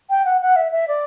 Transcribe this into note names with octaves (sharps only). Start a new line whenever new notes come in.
G5
F#5
F#5
E5
E5
D5